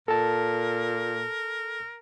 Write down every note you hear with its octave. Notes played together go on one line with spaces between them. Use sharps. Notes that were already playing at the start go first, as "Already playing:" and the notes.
A#2 A4 A#4 A5